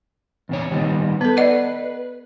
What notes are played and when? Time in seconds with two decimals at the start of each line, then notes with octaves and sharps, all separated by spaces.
0.49 E2 C3 C#5
0.71 D#3 G3 B3
1.21 B3 A4 B4
1.37 D5 D#5 F#5